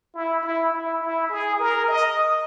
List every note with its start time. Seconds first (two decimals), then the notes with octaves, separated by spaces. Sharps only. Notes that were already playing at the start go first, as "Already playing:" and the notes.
0.14 E4
0.43 E4
0.73 E4
1.01 E4
1.30 G#4
1.59 A#4
1.88 D#5